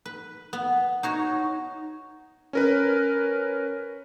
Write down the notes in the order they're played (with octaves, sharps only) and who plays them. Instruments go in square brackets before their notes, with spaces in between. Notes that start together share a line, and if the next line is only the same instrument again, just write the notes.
[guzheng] B4
B3
D#4 F#4 C#5
[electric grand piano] C#4 A#4 B4